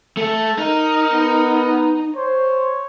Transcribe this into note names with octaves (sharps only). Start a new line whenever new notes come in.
A3 A4
D#4 A#4
B3
C5 C#5